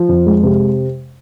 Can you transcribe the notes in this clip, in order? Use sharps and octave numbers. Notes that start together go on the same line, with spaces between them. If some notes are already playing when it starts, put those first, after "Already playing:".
Already playing: F3
F2
G#3
C3